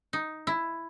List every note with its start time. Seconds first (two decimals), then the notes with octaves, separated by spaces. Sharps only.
0.13 D#4
0.47 E4